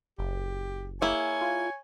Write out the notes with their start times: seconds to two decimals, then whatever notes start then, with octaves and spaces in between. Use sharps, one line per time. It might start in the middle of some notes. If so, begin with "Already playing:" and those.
0.19 F#1 G4
1.02 A#3 E4 G#4 C#5 G#5
1.42 F4